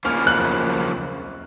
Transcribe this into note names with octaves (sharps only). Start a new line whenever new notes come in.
C#3 F3 A#3 C#4 F6
F#6